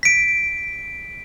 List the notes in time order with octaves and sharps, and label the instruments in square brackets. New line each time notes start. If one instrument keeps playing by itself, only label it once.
[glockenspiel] B6 D7